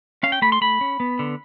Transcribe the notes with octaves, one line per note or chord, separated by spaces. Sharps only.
C#4 F5
G5
A3 B5
C6
A3 B5
C#4
B3
D3